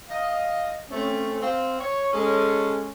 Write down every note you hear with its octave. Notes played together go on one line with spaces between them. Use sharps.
D#5 F5
A3 C4 C#4
C4 F5
C#5
G#3 C#4 A4